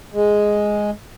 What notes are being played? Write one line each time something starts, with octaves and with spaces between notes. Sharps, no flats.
G#3